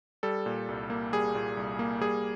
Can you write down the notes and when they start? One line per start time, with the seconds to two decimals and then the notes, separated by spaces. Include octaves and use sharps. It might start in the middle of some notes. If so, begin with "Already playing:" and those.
0.23 G3 A4
0.46 A#2
0.69 C2
0.90 A#3
1.12 G3 G#4
1.35 A#2
1.57 C2
1.79 A#3
2.01 G3 G#4